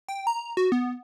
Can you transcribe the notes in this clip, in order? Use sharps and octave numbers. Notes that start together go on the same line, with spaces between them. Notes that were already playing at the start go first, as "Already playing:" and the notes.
G5
A#5
F#4
B3